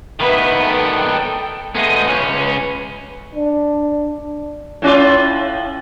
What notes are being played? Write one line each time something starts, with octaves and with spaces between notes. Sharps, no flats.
D#3 B3 B4 E5
A4 G5
G#3 A3 B3 D#6 G6
C#2 C#4 B4
D4
A2 C#4 F4